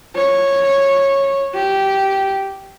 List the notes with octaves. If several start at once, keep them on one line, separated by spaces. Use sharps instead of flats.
C#5
G4